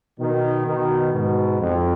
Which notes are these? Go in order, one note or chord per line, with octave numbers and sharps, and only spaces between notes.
B2 D#3
B2 D#3
G#2 B2
F2